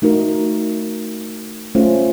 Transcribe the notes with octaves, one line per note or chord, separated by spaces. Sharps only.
A3 D#4 F#4 A#4
A3 C#4 F4 C5